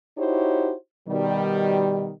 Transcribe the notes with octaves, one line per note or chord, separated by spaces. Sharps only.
D#4 E4 F#4 G4 C5 C#5
B2 D#3 G3